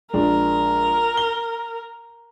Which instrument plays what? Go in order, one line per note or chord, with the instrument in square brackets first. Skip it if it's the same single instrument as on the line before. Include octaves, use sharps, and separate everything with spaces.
[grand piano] A#1 G#3 D4 [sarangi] A#4
[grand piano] G7